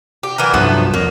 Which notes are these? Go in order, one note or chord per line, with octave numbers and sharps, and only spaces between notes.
G4
E3 F#3 A#4
C2 G2 F3 F#3 A3 B3
F2 A#3